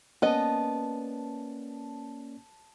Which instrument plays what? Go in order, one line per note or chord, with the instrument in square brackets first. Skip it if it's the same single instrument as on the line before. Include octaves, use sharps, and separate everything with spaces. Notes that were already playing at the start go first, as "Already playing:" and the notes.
[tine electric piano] A#3 C#4 D5 [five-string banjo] B3 D#5 [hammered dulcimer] A5